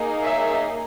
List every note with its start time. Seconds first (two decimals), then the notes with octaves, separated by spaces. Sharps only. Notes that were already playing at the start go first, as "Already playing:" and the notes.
Already playing: A#3 D#4 G#4
0.23 C#5 E5